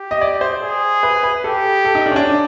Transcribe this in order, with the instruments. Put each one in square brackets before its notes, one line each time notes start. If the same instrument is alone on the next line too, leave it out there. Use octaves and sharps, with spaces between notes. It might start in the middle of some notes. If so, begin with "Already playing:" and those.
Already playing: [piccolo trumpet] G4
[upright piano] D#5
D5
C5
[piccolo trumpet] G#4
[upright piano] B4
B4
[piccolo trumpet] G4 [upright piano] A4
[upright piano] A4
D#4
D4
C#4
D4